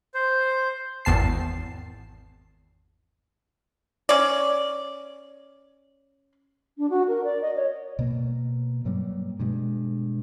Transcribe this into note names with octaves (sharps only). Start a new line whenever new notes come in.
C5
G#1 E2 A5 C7
C#4 D5
D4
F#4
A#4
D5
D#5
C#5
B2 A#3
G2 F#3 G3 A#3
G2 B2 G#3